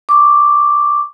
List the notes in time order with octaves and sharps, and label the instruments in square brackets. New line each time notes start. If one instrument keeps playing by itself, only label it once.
[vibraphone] C#6 D6